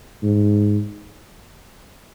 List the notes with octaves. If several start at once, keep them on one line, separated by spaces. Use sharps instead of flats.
G#2